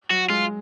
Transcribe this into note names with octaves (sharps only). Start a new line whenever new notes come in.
F#3 F#4
G#3 F4